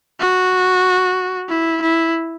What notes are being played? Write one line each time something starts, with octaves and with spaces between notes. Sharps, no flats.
F#4
E4
E4